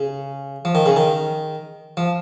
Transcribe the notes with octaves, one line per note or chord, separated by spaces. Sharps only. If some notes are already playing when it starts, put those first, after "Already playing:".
Already playing: C#3
F3
D#3
C#3
D#3
F3